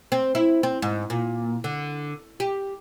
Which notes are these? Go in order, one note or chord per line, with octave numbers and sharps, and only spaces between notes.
C4
E4
C4
G#2
A#2
D3
G4